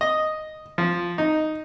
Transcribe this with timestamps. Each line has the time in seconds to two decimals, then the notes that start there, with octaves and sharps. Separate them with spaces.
0.01 D#5
0.78 F3
1.18 D#4